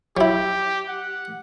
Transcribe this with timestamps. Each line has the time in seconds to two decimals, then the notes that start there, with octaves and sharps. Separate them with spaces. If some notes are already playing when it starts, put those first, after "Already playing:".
0.17 F#3 E4 G4
0.88 F#5